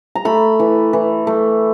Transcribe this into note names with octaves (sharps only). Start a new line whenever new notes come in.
A#5
A3 B5
E3
E3
A3